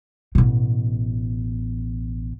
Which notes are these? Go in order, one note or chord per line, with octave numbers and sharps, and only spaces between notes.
A1 B2